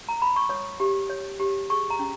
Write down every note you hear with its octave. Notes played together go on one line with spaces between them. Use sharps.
A#5
B5
C#6
C#5 D#6
G4
C#5
G4
G#4 C#6
A#5
C#4